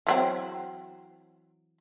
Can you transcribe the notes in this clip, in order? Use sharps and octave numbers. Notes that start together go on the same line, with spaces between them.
E3 F#3 C4